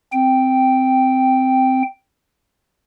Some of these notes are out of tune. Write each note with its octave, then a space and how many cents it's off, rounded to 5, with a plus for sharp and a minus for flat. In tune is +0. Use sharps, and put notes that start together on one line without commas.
C4 -10 G5 +0